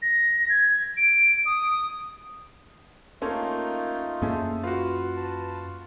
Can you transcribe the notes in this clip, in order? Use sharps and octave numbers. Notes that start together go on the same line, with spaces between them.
A#6
G#6
D7
D#6
A3 A#3 C#4 D#4 F4 A4
F#2 A#3 C#4 E4 G#4 A4
F4 F#4 B4
B4 A5